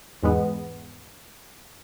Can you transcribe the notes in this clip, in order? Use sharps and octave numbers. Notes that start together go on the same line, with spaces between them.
E2 G#2 G#3 B3